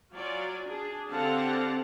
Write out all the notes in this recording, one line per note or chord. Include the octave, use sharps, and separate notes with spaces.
F#3 F4 D5 G#5
D4 G#4
D3 C4 G4 F5 F#5 A5